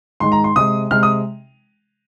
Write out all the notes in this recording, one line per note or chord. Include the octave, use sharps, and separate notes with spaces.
G#2 D#3 G#3 C6
A#5
C6
C3 G#3 D#6
C3 G#3 F6
D#6